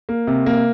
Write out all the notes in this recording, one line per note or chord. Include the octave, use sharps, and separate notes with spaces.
A#3
C3
A#3